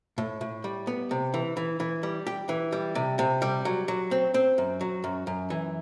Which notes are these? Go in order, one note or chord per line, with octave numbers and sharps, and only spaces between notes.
A2
A2
G3
B3
C3
E3
E3
E3
G3
G4
E3
G3
C3
C3
G3
F#3
F#3
C4
C4
F#2
F#3
F#2
F#2
E3